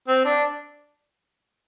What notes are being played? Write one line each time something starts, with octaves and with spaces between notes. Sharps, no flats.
C4
D4